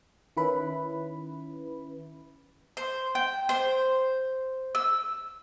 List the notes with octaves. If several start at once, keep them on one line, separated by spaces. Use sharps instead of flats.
D#3 C#4 E4 B4 B5
C5
G5
C5
E6